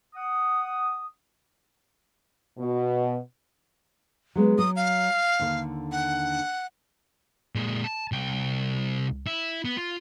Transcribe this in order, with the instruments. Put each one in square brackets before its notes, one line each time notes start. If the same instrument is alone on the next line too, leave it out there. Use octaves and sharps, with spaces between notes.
[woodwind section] F#5 D#6
[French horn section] B2
[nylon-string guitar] F#3 G#3 B3
[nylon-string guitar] F#3 [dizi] D#6
[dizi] F5
[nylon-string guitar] D#2 D3
[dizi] F#5
[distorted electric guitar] A#2 G#3
A5
C2 G5
E4
B3
F4